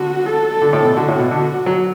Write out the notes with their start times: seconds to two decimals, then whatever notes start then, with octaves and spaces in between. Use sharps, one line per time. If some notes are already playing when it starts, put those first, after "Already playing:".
Already playing: D3 F#4
0.26 A4
0.62 D3
0.73 A2
0.84 B2
0.97 D3 F#4
1.08 A2
1.19 B2
1.31 D3
1.66 F#3